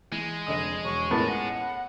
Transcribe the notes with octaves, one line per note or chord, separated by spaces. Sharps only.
E3 G#3
F1 D3 D#5 D#6
E1 C#6
A2 B3 C#4 F4 A#4 A6
F#5 A#6